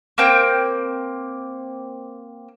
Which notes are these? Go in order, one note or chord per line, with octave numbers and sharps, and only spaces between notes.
A#3 C4 G5